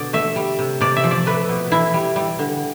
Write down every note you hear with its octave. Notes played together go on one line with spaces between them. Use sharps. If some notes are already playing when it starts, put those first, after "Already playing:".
Already playing: B2 D3 D5
A3 E5
G3
C3
C3 D5
E5
F3
D5
A3 B4
B2
E3 E4
G3
G3
D3